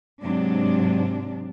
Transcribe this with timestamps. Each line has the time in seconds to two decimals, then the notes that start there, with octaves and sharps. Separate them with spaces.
0.23 G#2 C3 F#3 D4